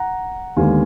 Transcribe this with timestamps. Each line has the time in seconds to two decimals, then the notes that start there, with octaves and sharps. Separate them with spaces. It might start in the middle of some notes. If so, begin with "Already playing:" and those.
Already playing: F#5 A#5
0.56 D#2 D3 G#3 B3 F5 G#5